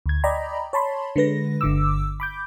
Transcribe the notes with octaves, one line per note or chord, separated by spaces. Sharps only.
D2 G#6
D5 D#5 G5 A#5 B5
C#5 A5 B5 C6
D3 G#3 B4 A#6
G1 D3 D6 E6
B5 D6 G6